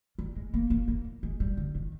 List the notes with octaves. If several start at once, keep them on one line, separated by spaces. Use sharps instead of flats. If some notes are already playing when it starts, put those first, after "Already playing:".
G3
G#3
A#3
A#3
A#3
G#3
G3
D3
D#3